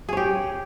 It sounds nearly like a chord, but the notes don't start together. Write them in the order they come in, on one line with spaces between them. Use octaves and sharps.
G#4 C#5 G4